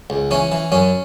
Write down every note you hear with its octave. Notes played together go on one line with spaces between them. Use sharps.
C#2
E3 C#4
E3
F#2 C#4